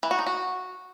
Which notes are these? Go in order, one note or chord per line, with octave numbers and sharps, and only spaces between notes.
E3
F#4
D#4
F#4